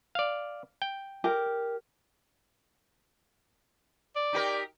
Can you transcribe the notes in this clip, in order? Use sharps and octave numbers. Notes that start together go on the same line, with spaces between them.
D5 F5
G5
G4 A#4
D5
D#4 G4 A#4